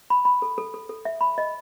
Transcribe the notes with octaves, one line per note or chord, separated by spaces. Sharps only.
B5
B5
A4
A4
A4
A4
E5
B5
D#5